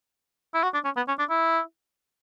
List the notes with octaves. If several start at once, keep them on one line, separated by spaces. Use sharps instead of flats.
E4
F#4
D4
C#4
B3
C#4
D4
E4